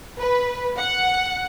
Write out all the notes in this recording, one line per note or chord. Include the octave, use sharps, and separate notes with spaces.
B4
F#5